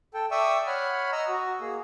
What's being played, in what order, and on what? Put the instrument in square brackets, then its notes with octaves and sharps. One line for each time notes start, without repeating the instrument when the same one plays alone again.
[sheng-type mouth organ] A4 G5
D5 E5 G5 C#6 D#6 E6
C#5 F#5 B5 F6
D#5 A#5 E6
F#4
A#3 G#4